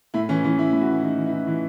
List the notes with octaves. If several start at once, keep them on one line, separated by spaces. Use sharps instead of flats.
A2 E4
E3 C#4
E3 C#4
A2 E4
A2
F#4
E3
E3 D#4
E3
E4
E3
E3